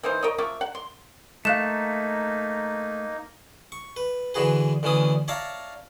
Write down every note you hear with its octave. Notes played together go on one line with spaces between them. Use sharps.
E3 A#3 D#4 C5
A#4 C#5 D#5
F3 A#3 E5 C#6
F#5
C6
A3 A#3 D#4 F5 F#6 E7
C#6
B4
D3 E3 F#4 G#4 B4
D2 D3 E3 C#4 D#6
C#5 D5 E5 F5 A5 A#5